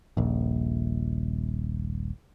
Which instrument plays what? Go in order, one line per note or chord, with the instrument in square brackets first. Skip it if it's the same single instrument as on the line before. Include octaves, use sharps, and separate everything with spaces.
[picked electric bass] D#1 A#1